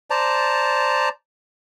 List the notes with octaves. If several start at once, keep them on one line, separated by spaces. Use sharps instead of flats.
C5 D5 A5 A#5